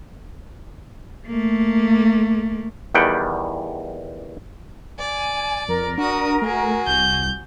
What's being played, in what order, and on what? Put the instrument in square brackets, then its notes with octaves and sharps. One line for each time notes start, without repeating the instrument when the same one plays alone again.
[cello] A3 A#3
[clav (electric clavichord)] E2 D#3 G3 F#5 G5
[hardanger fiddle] D5 [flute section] G#5
[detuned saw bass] F2 [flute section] A#4
[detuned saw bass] D4 [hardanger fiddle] F#4 D#6
[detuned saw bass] A3 [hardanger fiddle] F#4 G#4
[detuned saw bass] C2 [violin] G6